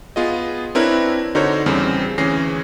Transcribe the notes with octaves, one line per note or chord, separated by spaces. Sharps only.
B3 F4 G#4 D#5
C4 D4 E4 A#4 B4 C#5
D3 D#4 F#4 A#4 C5 C#5
E2 C#3 G3 C4
D2 E3 C#4 G#4 A#6 C7